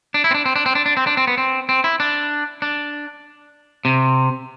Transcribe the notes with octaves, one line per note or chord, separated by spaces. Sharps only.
D4
E4
C4
D4
C4
D4
C4
D4
D4
C4
D4
C4
B3
C4
C4
E4
D4
D4
C3